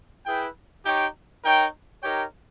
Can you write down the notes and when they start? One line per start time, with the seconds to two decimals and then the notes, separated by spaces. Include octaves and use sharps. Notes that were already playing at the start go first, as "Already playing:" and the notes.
0.25 E4 G#4 B4 G5
0.85 D#4 G4 C#5 G5
1.44 D#4 A#4 C#5 G5
2.03 D#4 G4 A#4 C#5 G5